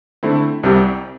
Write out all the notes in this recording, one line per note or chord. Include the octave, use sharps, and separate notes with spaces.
D3 A3 C4 E4
C2 C3 G3 C4 G4